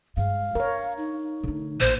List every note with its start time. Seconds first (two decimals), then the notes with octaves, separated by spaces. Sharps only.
0.17 G2 G#3 F5
0.55 D4 A#4 C#5
0.98 D#4
1.44 D3 A3
1.80 A1 A#2 C5